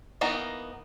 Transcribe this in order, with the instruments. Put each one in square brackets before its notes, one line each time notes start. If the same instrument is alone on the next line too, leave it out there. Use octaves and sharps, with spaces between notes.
[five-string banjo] E3 A#3 B3 D#4